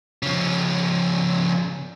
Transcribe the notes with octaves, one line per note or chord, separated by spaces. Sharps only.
C#3 F3